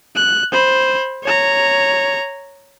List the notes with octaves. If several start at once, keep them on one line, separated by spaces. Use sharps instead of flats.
F#6
C5 B5
C#5 A#5